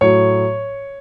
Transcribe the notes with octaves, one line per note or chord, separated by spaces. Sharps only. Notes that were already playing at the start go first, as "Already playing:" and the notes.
A2 F#3 C#5 C#6